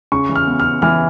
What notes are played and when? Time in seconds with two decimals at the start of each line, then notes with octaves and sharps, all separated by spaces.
0.12 C#3 C#6
0.29 E3
0.35 F6
0.47 B3
0.60 F6
0.65 C#3
0.82 E3 F6